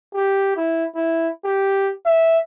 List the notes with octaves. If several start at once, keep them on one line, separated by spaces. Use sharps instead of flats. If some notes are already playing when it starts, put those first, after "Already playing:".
G4
E4
E4
G4
E5